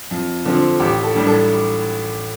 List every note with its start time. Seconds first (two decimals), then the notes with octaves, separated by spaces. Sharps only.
0.11 F2
0.45 D3 F3 C4
0.80 A1 G4
1.03 A4
1.15 A2 G3 D4
1.27 A4